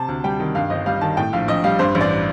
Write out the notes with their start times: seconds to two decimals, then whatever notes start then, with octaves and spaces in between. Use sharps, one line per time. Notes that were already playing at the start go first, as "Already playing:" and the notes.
Already playing: C3 A5
0.08 D2
0.24 G3 G5
0.40 D#3
0.55 G2 F5
0.70 G1 D#5
0.86 G3 F5
1.01 D#3 A5
1.17 A2 G5
1.33 A#1 F5
1.48 A#1 D#5
1.64 G3 F5
1.79 G2 C5
1.95 A1
2.01 D5